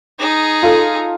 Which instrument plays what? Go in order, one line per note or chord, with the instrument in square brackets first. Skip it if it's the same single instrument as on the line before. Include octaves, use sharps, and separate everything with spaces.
[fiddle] D#4 G#4
[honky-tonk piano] F4 A4